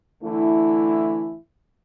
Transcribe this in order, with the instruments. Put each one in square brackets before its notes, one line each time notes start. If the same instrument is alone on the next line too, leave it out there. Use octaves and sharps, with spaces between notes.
[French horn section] D3 E3 A3 E4